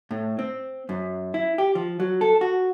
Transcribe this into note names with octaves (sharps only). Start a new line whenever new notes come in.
A2
C4
F#2
E4
G4
F3
F#3
A4
F#4